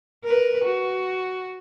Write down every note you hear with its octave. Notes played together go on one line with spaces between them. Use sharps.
A#4 B4
F#4